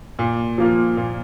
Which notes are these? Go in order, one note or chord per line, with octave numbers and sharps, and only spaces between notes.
A#2
F3 A#3 F4
A#2